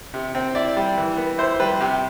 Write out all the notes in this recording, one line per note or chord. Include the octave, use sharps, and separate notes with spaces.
C3
C4
E4 D5
G3
E3
B3
E4 C5
G3 B4
C3 G4